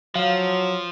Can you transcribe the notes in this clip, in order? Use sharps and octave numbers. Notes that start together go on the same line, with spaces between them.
F3 F#3 F5